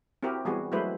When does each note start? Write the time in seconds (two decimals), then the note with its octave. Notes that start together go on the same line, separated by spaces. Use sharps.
0.23 C4 E4 F#4 G4 A#4
0.45 E3 G3 B3 F#4 G#4
0.72 F#3 G#3 A3 E4 B4 C5